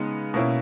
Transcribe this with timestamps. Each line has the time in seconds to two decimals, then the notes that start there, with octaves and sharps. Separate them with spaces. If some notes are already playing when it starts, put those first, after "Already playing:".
Already playing: C#3 G#3 B3 D#4
0.34 B2 A#3 C#4 E4